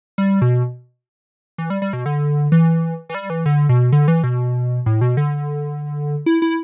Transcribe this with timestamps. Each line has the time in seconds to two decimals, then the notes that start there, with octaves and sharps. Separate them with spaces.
0.18 G3
0.42 B2
1.58 E3
1.70 G3
1.82 G3
1.93 B2
2.06 D3
2.52 E3
3.09 E3
3.15 G3
3.30 E3
3.46 D3
3.69 B2
3.92 D3
4.08 E3
4.24 B2
4.86 A2
5.01 B2
5.17 D3
6.26 E4
6.42 E4